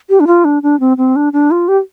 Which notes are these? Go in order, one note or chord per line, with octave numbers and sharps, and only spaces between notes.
G4
D4
F4
D4
D4
C4
C4
D4
D4
F4
G4